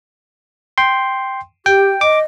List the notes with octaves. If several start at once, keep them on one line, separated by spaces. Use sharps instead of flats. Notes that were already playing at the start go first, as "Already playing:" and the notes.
G5 C6
G4 G5
D#5 D6